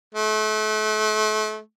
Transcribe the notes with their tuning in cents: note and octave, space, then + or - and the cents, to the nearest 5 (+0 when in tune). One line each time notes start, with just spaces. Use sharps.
A3 -35